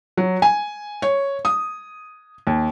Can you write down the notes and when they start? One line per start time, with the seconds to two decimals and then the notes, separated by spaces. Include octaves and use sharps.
0.17 F#3
0.42 G#5
1.02 C#5
1.45 D#6
2.47 D#2